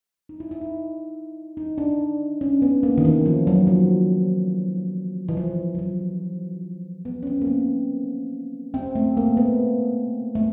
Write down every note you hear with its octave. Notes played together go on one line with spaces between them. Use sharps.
D#4
E4
E4
D#4
D#4
D4
C#4
B3
A#3
D#3
E3
F3
F#3
F3
E3
F3
F#3
F3
B3
C#4
C4
A#3
B3
C4
A3
A#3
B3
A3